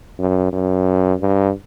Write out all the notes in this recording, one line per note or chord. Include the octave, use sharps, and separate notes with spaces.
F#2
F#2
G2